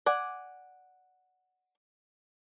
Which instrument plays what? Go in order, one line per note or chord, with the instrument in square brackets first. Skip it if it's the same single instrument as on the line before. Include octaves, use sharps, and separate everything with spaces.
[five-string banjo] D5 F#5 G#5